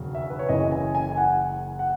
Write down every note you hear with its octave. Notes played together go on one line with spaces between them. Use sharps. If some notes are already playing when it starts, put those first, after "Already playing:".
Already playing: E1 D#2 C#3 F#3
E5
B4
C#5
F#1 F#2 E3 D#5
G#5
G#5
G#5
F#5
F#5